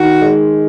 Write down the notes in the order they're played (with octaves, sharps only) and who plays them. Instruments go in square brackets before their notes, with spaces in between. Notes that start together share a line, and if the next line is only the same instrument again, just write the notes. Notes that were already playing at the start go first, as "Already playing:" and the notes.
Already playing: [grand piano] D#3 [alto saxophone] F#4
[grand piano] G#3